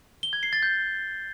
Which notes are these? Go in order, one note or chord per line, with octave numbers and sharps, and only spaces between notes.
G7
G#6
C7
A6
G6